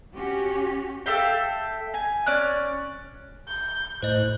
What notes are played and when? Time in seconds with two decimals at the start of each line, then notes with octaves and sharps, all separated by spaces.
0.15 C#4 F#4 G4
1.06 A4 E5 F5 G5
1.94 G#5
2.26 C#4 D5 F#6
3.48 G6
4.02 A2 C5 D#5 F#6